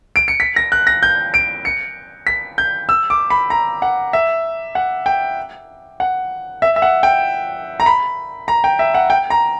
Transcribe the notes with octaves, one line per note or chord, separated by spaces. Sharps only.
D7
C#7
B6
A#6
F#6
A#6
G6
D7
C#7
B6
G6
E6
D6
B5
A#5
F#5
E5
F#5
G5
F#5
E5
E5
F#5
G5
A#5
B5
A#5
G5
E5
F#5
G5
A#5